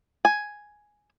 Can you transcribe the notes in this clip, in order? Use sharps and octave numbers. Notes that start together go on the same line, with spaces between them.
G#5